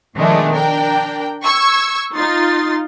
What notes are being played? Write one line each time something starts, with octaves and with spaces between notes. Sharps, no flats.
B2 D#3 F3 G#3 A3 D4
D4 A#4 G5
C#6 E6 G#6
D#4 F4 C6 A6